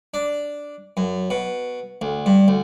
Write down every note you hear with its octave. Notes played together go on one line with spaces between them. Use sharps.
D4
F#2
B2
D2
G2
D2